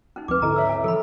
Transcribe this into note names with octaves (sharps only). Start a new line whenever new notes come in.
C#4 D#4
D2 F3 C4 B4 D6
G#2 D3 E4 A4 D#5 A#5
C#5 E5 E6
G#5
E3 F3 A4 B5 E6